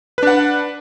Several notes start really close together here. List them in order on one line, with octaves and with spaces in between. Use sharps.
B4 D4 F#5